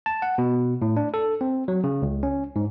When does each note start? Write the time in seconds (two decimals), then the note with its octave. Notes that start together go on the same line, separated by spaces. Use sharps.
0.06 A5
0.22 F#5
0.38 B2
0.82 A2
0.97 D4
1.14 A4
1.41 C4
1.68 F#3
1.84 C#3
2.02 C#2
2.23 C#4
2.56 G#2